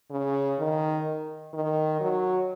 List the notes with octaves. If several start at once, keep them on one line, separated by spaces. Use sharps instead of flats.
C#3
D#3
D#3
F#3